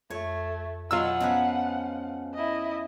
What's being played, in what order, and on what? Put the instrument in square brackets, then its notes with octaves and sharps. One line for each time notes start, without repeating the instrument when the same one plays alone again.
[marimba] F2 [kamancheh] A3 [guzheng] C#5
[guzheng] B2 F#3 G#3 [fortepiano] F4 E6 [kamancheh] F#5
[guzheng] C#3 F3 B4 [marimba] B3
[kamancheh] E4 D#5